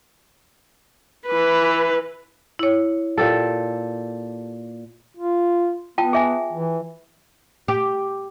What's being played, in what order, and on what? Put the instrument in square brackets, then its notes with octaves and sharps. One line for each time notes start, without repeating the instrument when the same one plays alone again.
[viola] E3 B4
[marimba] E4 C#5
[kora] A#2 G4 A4
[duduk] F4
[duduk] B3 [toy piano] F4 G5 A5
[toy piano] G#4 E5 G#5
[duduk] E3
[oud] G4